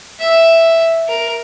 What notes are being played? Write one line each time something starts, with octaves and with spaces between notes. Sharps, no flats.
E5
A#4